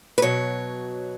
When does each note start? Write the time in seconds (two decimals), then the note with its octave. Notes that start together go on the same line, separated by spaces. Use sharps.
0.18 B4
0.22 B2 F#3 C#5